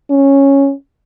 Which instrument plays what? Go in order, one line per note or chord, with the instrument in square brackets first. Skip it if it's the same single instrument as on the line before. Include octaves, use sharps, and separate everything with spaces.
[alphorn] C#4